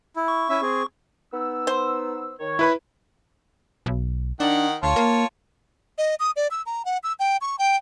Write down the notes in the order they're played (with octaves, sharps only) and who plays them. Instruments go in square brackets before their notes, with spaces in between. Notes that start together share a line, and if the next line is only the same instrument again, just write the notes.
[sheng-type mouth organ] E4
[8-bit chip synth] C#6
[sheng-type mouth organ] C#4 E4 E5
C4 G#4
[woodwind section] B3 D#4 E6
[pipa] C5
[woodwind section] D#3 C#5
[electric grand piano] E4 B4 B5
[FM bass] B1
[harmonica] D#3 F#5 [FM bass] D4
[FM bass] D2 [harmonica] F4 C#5 A5
[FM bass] A#3
[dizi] D#5
D#6
D5
E6
A#5
F#5
E6
G5
C#6
G5